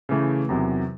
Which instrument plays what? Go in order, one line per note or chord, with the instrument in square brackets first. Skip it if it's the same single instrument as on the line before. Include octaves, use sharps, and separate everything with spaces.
[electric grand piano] C#3 E3 A3
E2 C3 D#3 F#3